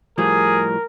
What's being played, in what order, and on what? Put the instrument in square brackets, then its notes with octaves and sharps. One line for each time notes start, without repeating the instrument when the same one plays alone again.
[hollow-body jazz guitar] A2 F3 G3 [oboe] G#4 [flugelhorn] A#4